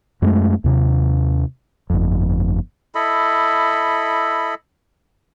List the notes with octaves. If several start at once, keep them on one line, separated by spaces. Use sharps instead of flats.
F#2 G#3 A3
D#2 C3
G1 F2
E4 A4 D#5 B5